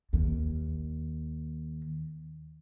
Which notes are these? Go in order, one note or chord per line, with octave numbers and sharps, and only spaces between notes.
D#2 A#3